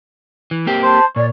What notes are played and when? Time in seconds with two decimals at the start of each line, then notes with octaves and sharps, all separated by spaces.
0.51 E3
0.66 A#3 C4 G4
0.83 C5 A5
1.16 A#2 C#5 D5